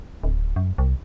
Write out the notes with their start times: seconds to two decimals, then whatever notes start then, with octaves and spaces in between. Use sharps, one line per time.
0.24 D1
0.56 F#2
0.78 C2